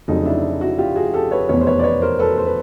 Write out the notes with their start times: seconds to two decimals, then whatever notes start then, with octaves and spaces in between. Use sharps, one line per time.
0.08 F1 F2 C#3 F#3 D#4
0.25 D4 E4
0.61 E4 F#4
0.78 F4 G4
0.96 F#4 G#4
1.14 G4 A4
1.31 B4 C#5
1.49 F1 E2 B2 B4 C#5
1.61 C5
1.66 B4 C#5
1.79 D5
1.84 B4 C#5
2.02 A#4 C5
2.19 A4 B4
2.38 C5
2.47 B4